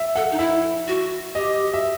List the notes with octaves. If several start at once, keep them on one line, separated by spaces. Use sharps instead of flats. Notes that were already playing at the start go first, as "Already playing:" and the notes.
Already playing: E5
A4 F#5
D#4
E4 E5
F#4
G4 D#5
E5